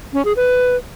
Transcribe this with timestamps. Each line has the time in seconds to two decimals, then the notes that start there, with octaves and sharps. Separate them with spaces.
0.13 C#4
0.25 G#4
0.36 B4